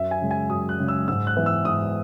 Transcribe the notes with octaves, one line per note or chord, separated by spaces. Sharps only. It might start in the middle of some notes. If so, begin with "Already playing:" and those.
Already playing: F#2 E5
G#5
C#3 G#3
G#5
F#2 D#6
F#6
C#3 G#3
E6
G#2 E6
F#6
E3 B3
E6
G#2 D#6